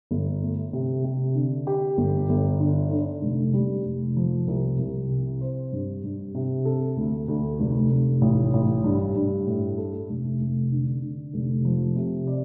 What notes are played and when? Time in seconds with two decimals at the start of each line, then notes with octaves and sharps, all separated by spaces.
0.11 G1
0.42 A3
0.73 C3
1.04 C3
1.35 D3
1.67 G4
1.97 G1
2.29 G1
2.60 D3
2.91 D3
3.22 F1
3.53 G3
3.85 F1
4.16 F3
4.47 C2
4.79 C2
5.10 C3
5.41 C5
5.72 G2
6.04 G2
6.35 C3
6.65 A4
6.97 D2
7.28 D2
7.59 F1
7.90 F1
8.21 A1
8.53 A1
8.84 G2
9.15 G2
9.47 A2
9.78 A4
10.09 F1
10.40 F1
10.72 D3
11.02 D3
11.34 F1
11.65 F3
11.96 C3
12.27 D5